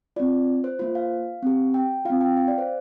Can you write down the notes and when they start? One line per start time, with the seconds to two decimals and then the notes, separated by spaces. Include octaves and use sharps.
0.16 C4 F4 D5
0.64 C5
0.79 A#3 F4 C5
0.95 F5
1.43 C4 G4
1.74 G5
2.05 C4 F4 F5
2.21 G5
2.37 F5
2.48 D5
2.58 C5